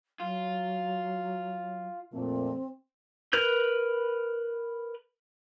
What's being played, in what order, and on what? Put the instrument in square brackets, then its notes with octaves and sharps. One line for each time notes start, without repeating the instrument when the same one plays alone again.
[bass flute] F#3 [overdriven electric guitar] F4
[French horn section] F2 A#2 A3 [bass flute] C4
[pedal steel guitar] A#4 B4 G6